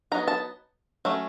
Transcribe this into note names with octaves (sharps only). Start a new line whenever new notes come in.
F#3 B3 D#4 A#5
A5
F#3 A3 C#4